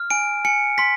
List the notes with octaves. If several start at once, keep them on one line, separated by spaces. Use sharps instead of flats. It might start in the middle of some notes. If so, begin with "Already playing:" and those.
Already playing: F6
G#5 D7
G#5 C#7
C6 B6